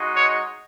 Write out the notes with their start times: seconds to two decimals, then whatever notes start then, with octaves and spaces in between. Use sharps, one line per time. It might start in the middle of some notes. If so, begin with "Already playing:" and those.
Already playing: G#3 D#4 F#4
0.16 C#5